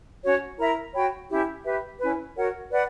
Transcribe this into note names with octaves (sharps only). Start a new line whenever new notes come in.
C#4 F#4 C#5
E4 A#4 E5 A#5
F#4 C#5 G5 B5
C#4 E4 G4
G4 B4 E5 B5
C#4 E4 B4
F#4 A#4 C#5 F#5
B4 D5 F#5